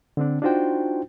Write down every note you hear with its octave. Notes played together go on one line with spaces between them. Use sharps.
D3 C4 D4
D4 D#4 F4 F#4 C5 G5